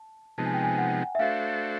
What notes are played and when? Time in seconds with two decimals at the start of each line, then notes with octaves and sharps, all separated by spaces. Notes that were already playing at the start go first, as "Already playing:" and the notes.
Already playing: A5
0.38 C3 F3 G#3 B3 D#4 A5
0.46 G#5
0.54 G5
0.63 G#5
0.78 F#5
1.15 E5
1.19 A3 D4 F#4 A4 C5 F5